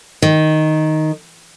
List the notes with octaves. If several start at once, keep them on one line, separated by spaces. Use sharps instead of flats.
D#3